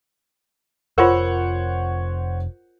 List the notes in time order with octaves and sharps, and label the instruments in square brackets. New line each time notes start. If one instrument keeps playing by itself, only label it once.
[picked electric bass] F1 [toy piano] F4 A#4 [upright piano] C5 C#5 F#5